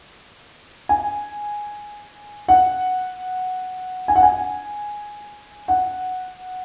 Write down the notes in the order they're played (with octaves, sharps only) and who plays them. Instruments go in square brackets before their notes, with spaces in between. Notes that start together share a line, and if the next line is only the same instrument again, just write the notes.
[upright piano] G#5
F#5
G#5
F#5
G#5
F#5